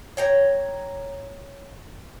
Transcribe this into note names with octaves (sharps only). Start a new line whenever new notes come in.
C#5 G5 A#5